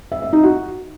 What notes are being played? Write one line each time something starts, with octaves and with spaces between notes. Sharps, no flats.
E5
E5
D#4
F#4